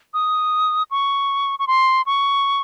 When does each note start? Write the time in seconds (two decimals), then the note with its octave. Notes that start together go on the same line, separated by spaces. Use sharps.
0.14 D#6
0.91 C#6
1.59 C#6
1.67 C6
2.06 C#6